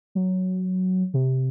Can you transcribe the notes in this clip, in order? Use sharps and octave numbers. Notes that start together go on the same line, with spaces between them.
F#3
C3